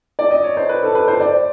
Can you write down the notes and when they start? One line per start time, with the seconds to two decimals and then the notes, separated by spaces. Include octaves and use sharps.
0.19 D5
0.31 D#5
0.44 C#5
0.57 C5
0.69 B4
0.83 A4
0.95 B4
1.08 C5
1.20 D5